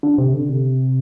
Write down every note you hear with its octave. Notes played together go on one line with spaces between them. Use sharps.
D3
C3
D3
C3